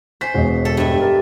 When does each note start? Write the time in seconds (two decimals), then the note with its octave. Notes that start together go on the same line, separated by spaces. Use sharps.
0.21 C5 G#5 B6
0.34 E1 D#5
0.65 A4
0.77 G2 E5
1.01 G4 A#4